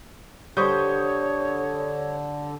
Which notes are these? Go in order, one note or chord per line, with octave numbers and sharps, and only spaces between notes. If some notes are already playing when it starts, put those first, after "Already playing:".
D3 G3 C5 C#5 C#6 D#6 G6